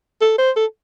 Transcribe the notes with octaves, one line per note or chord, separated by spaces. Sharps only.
A4
C5
A4